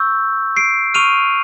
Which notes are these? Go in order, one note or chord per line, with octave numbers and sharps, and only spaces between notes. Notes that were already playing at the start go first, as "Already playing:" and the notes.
Already playing: C#6 E6 G6
C7 D7
C#6 F6 D#7 F7